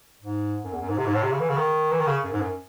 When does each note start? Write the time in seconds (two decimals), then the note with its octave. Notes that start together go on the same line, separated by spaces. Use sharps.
0.21 G#2
0.64 F#2
0.73 E2
0.81 F#2
0.89 G#2
0.97 C3
1.06 G#2
1.14 A2
1.23 C3
1.32 C#3
1.40 E3
1.49 C#3
1.57 D#3
1.91 E3
1.99 D#3
2.07 C#3
2.24 F#2
2.32 G#2
2.41 F#2